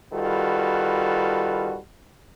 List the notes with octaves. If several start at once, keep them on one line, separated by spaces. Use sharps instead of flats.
D#3 G3 F4 F#4 A4 B4